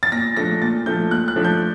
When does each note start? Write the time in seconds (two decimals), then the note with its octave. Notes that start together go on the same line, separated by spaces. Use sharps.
0.03 A6
0.12 A#2 A#6
0.37 F3 A3 D4 A#6
0.61 A#2 A6
0.86 F3 A3 D4 G6
1.11 A#2 F#6
1.28 F#6
1.36 F3 A3 D4
1.44 G6